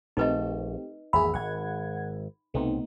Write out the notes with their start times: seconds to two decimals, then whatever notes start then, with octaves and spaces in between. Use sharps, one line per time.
0.17 A#1 A3 C4 D#4 G4 B4 D#5
1.13 G#1 E2 A#3 G#4 E5 B5
1.34 G#1 F#5 G#6
2.54 C2 B2 A3 B3 C4 D#4